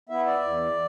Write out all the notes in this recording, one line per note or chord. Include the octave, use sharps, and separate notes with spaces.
B3 E4 E5
D5
E2